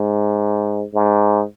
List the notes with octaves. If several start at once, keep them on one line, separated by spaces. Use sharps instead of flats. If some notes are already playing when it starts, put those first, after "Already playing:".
Already playing: G#2
G#2